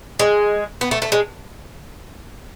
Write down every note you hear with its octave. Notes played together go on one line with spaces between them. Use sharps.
G#3
B3
A3
A3
G#3